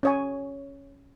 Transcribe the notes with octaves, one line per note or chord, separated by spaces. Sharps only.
C#4 C#5 G#5